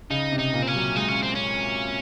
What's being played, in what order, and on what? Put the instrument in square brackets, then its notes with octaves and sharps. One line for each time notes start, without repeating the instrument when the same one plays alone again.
[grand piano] C#3 [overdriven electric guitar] D#4
[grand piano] C3
[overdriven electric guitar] D#4
[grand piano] A#2
[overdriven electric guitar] C4
C#4
[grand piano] F#3
[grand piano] G#3 [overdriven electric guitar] D#4
[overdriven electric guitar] C#4
C4
C#4